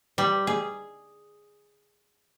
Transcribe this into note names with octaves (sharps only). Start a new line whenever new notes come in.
G3
G#4